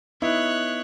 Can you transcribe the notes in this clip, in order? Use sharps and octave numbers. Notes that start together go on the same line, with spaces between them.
B3 D#4 E4 C#5 F#6